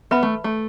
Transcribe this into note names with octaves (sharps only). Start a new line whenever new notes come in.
B3 B4 E5 B5
A3
A3